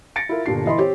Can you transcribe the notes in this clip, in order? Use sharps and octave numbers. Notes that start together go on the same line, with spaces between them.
A6 A#6 C#7 D7
E4 F4 A#4
G1 A#2 D4 G4 C7
E3 D#5 B5 C6
C4 G4 C#5